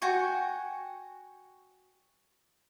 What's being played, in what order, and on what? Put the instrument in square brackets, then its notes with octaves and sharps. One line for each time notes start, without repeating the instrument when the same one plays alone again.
[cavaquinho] F#4 G5 G#5 C#6